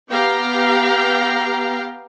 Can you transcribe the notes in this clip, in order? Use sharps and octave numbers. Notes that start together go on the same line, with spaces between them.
B3 G4 F5 G5 A#5